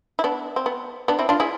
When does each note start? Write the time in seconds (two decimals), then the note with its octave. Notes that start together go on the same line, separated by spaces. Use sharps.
0.19 E4
0.24 B3 D4
0.56 C4
0.66 B3
1.08 B3 D4
1.19 C4 E4
1.29 D4 F4
1.40 E4 G#4